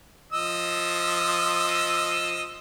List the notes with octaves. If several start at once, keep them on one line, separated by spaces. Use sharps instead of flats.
F3 D#5 E6